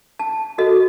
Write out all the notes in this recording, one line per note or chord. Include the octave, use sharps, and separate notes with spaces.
A5
F#4 A4 D#5